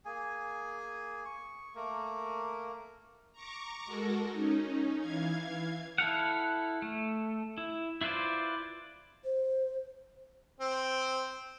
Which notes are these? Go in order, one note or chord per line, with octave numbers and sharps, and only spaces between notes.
A#3 G#4 G#5
C#6
A3 A#3 A#4
A#5 C#6 D6
G#3 F#4 A4 A#4
C#4 D#4
E3 F5 G#6
E4 A4 F5 F#5
A3
E4
E4 F4 B4 C5 D5
C5
C4